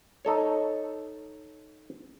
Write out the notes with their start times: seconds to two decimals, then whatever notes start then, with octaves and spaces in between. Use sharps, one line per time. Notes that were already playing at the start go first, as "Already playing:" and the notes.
0.25 D#4 A4 C#5